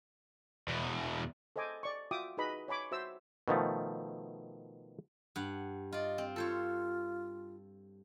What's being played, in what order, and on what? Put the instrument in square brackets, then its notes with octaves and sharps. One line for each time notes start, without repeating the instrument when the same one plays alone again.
[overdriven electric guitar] E2 B2
[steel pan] A4 C5 D#5 G#5 D6
D5 C#6
F4 F#4 E5 G5 D6 D#6
D#4 F#4 G#4 B4 D#5 B5
C#5 G#5 B5 D6
F#4 C5 E5 E6
[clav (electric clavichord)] B2 D#3 F3 A3
[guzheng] G2 F#5
[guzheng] F4 D5 [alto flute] D#5
[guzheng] C4
[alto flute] F4 [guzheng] A4 C5 C#5